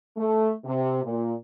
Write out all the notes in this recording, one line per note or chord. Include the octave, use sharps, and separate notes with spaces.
A3
C3
A#2